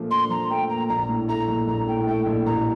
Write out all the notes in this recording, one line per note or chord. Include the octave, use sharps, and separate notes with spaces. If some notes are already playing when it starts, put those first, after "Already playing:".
Already playing: A#2 F3 A3 D4
D4 C6
F3 A#5
A3 G5
A#2 A#5
A#1 A#5
A2
A3 A#5
A#1
A#1 A#5
A2 G5
A3 G5
A#1
A1 A#5